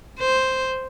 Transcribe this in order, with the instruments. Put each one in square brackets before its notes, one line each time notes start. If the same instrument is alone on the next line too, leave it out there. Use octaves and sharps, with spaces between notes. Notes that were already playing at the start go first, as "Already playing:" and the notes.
[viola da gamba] C5